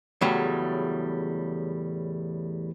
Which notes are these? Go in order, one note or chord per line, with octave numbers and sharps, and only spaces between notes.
E2 A2 C#3 F#3 G3